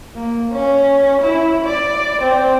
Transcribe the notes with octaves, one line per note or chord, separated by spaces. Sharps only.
A#3
C#4
E4
D5
C4